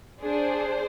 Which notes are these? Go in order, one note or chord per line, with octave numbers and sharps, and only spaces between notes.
D4 G#4 C5